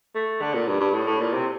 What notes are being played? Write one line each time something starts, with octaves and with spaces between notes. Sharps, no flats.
A3
D3
A#2
G2
G2
A2
A2
A#2
C3